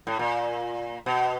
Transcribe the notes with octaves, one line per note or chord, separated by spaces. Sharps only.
A2
A#2
B2